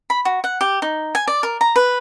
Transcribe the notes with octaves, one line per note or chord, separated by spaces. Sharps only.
B5
F#4
F#5
G4
D#4
G#5
D5
A#4
A#5
B4